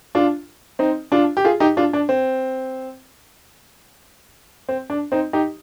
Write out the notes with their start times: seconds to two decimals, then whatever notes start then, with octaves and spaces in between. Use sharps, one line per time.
0.15 D4 F4
0.79 C4 D#4
1.12 D4 F4
1.37 G4
1.45 F4 G#4
1.60 D#4 G4
1.77 D4 F4
1.93 D4
2.09 C4
4.69 C4
4.90 D4
5.12 C4 D#4
5.33 D#4 G4